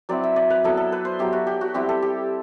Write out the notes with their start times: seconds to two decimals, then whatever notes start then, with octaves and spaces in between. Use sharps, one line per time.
0.09 F#3 C4 E4 D5
0.24 E5
0.36 D5
0.50 B4
0.64 F#3 B3 E4 A4
0.77 A4
0.92 B4
1.05 C5
1.19 F#3 B3 E4 G4
1.33 F#4
1.47 G4
1.61 F#4
1.74 G3 C4 E4 G4
1.89 A4
2.02 G4